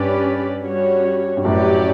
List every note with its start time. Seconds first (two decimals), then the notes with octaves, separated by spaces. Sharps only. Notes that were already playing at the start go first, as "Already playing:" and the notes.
Already playing: G2 C#4 G4 B4 D5
0.62 G3 C#4 F#4 C#5
1.37 G2
1.45 F#2 A2 F#3 C#4 G4 B4 D5